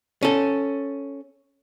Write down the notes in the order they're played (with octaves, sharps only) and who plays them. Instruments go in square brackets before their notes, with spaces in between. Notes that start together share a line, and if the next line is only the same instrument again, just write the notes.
[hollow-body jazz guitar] C#4 A4